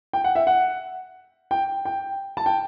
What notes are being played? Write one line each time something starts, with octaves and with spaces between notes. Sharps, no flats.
G5
F#5
E5
F#5
G5
G5
A5
G5